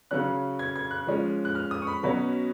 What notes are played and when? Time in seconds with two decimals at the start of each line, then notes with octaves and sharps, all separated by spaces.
0.11 C#3 F#3 C#4 F#6
0.59 G#6
0.76 G#6
0.91 F#6
1.07 F3 G#3 C#4
1.45 F#6
1.55 F6
1.71 D#6
1.82 C#6
1.87 B5
2.03 B2 F#3 C#4 B5